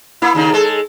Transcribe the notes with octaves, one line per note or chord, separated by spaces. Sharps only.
A#3 E4
D#2 C#3 D#4
G#3 A4